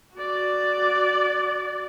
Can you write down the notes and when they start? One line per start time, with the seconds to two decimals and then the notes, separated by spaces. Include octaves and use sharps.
0.14 F#4 D5